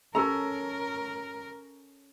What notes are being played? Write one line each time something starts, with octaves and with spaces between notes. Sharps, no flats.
C#4 A4 A#4 A#5